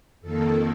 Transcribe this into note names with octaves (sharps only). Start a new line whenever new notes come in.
F2 D#3 A#3 A4